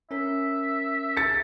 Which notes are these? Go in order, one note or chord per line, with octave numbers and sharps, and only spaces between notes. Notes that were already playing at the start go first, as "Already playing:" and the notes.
C#4 A#4 E5
A6 C#7